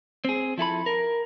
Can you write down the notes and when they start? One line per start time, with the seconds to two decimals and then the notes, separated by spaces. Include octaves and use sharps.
0.25 C4 G#4
0.58 F3 E4 A4 B5
0.86 A#4